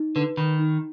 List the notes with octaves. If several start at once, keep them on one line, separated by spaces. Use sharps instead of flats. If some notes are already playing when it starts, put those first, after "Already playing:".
Already playing: D#4
D3 B4
D#3 B5
D#4